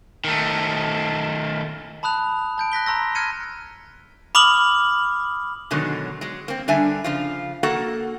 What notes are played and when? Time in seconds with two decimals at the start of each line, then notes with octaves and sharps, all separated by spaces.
0.24 D#3 A3
2.03 A5 B5 D#6 F#6 F7
2.58 A5 G6 D7
2.72 F#6 A#6 B6 G7
2.86 A#5 C6 E6 A#6
3.15 F6 F#6 G#6 C#7 D#7
4.35 B5 D6 D#6 F6 F#7
5.71 B2 D3 D#3 F#3 G#3
6.21 F#3 G#3
6.48 A#3 C4
6.68 D3 G3 D4 E5 G#5
7.04 C#3 F3 F4
7.63 A#3 F#4 A4 F#5